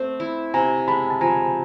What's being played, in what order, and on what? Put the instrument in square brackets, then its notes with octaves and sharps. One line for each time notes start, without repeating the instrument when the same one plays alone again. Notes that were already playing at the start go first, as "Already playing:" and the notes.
Already playing: [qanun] A3 C4
E4
[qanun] C3 [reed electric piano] G#5 A#5
[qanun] G#3 [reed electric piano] A5 B5
[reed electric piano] A5
[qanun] F3 [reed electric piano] G#5 A#5